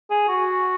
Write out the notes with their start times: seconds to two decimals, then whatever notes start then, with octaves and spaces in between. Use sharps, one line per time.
0.11 G#4
0.28 F#4